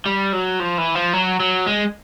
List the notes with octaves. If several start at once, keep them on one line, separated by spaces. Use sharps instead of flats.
G3
F#3
F3
E3
F3
F#3
F#3
G#3